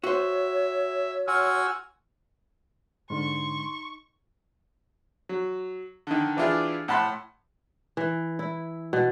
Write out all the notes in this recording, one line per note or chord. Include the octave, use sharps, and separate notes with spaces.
F#4 C5 C#5 E5
F#4 G#5 C6 E6 F6
G#2 D3 D#4 C6 C#6
F#3
D3 D#3
E3 D4 E4 F4 G4 G#4
A2 F#5 A5 B5 C6
E3
E4
B2